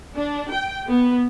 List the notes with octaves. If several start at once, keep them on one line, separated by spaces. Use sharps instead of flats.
D4
G5
B3